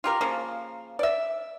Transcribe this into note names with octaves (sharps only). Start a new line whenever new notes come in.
F4 G4 A#4
C#3 F3 A#3
D5 E5